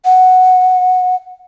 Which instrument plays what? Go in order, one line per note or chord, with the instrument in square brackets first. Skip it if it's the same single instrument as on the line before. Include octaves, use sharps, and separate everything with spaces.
[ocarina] F#5